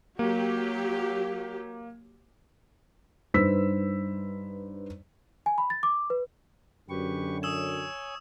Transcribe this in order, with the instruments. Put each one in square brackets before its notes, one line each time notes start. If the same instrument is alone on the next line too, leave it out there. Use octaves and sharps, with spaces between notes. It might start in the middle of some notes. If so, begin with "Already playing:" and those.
[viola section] F#3 G4 [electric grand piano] A#3
[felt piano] G2 D#4 B4 C5 E6 B6
[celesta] G#5
B5
A6
D6
B4
[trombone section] F#2 D3 [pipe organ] G4 B4 C#6
[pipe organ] C#5 G#5 [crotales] D#6 E6 E7